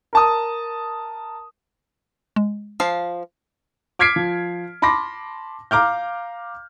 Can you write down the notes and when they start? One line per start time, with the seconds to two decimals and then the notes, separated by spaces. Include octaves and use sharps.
0.13 A#4 A5 D#6
2.36 G#3
2.80 F3 F5
3.99 D6 F6 G#6 B6 C7 D7
4.16 F3
4.82 A5 B5 C6 D6 A#6
5.71 F5 A#5 D6 F6 G6